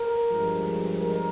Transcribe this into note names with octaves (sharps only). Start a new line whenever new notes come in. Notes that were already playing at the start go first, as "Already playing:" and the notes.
Already playing: A#4
G2 F3 G#3
A#4